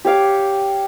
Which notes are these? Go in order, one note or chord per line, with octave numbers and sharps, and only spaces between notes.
G4 C#5 F5 D6